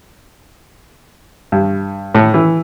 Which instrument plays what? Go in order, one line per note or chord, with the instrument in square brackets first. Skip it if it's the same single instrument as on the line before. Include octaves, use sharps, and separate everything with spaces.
[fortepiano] G2
A2
E3